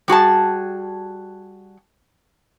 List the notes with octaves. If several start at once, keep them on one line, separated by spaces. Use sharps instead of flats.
G3 F#4 G#4 A5